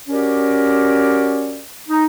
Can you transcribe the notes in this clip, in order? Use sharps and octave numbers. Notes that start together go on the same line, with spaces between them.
C#4 F#4 G4 A#4 D5
D#4